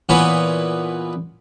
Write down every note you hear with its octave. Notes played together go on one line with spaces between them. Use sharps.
A#2 E3 B3 C#5 G#5 B5